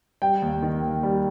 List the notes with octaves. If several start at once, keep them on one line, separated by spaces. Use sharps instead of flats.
G3 G5
D#2
D#3
D#2
G3